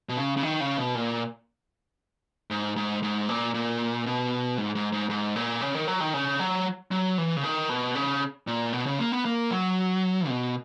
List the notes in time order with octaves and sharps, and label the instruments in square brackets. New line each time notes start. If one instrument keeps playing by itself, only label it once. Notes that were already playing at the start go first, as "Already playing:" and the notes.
[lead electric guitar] B2
C#3
C#3
D#3
C#3
B2
A#2
G#2
G#2
G#2
A#2
A#2
B2
G#2
G#2
G#2
G#2
A#2
C#3
D#3
F#3
D#3
C#3
F#3
F#3
E3
C#3
D#3
B2
C#3
A#2
B2
C#3
A#3
B3
A#3
F#3
B2